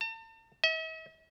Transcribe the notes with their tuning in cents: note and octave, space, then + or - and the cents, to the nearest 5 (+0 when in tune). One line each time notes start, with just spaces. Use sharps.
A5 +40
E5 -45